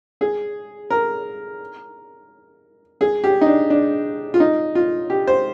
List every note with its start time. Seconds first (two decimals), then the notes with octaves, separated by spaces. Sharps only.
0.21 G#4
0.90 A#4
3.01 G#4
3.24 G4
3.41 D#4
3.46 D4
3.70 D4
4.34 F4
4.40 D#4
4.75 F4
5.10 G4
5.27 C5